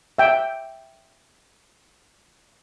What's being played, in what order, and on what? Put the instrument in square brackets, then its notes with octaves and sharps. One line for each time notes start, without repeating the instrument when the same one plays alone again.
[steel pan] E5 G5